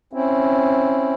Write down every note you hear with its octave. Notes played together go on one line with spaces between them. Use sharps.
C4 C#4 E4